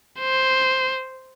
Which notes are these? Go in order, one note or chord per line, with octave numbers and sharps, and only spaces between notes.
C5